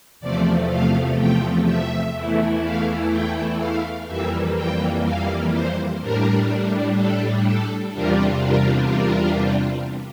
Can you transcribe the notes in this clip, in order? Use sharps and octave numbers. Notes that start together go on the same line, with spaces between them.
E2 C3 F3 A3 D5
F5
G5
E5
E2 E3 A3 E4
F5
G5
F5
F2 E3 G3 A#3 E5
G5
F5
C5
A2 G3 D4 A#4
A4
A4
E2 C3 G3 D4 F4 A#4
A#4
A#4